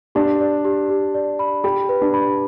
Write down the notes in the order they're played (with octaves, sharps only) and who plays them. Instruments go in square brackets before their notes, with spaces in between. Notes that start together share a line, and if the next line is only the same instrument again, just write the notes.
[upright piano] D4 [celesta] G4
[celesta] D5
G4
G4
D5
B5
[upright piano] G4 [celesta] B5
[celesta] B4
[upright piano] D4
[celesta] B5